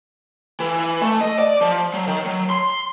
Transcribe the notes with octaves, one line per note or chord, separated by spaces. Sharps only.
E3
A3
D#5
D5
F3
F#3
D#3
F#3
C6